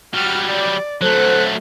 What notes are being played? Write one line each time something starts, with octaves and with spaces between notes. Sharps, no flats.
F#3 G3 F6
D5
D2 F#3 A3 A4 C5 F#6